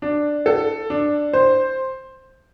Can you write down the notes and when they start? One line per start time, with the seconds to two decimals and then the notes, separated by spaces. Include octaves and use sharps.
0.02 D4
0.46 A4
0.90 D4
1.33 C5